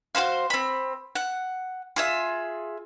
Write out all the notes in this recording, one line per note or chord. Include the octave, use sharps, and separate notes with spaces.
F#4 G#4 C5 F5
C4 B5
F#5
F4 G#4 E5